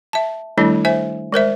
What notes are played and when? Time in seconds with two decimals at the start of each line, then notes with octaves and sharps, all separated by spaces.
0.13 E5 A5
0.58 D#3 G3 A3 D4 E4
0.85 C5 E5 G#5
1.32 G#3 A#4 C5 E5